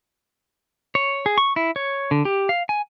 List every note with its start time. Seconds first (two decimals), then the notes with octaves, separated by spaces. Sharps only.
0.95 C#5
1.26 G#4
1.38 C#6
1.56 E4
1.76 C#5
2.11 D3
2.25 G4
2.49 F5
2.69 G#5